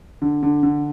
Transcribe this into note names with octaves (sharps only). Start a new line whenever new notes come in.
D3
D3
D3